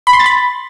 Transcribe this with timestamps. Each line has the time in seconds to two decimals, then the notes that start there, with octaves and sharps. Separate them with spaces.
0.07 B5
0.13 C6
0.19 A6
0.26 B5